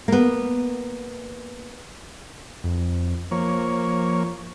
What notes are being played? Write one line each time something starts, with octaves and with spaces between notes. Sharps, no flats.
A#3 B3
F2
F3 A#3 C#5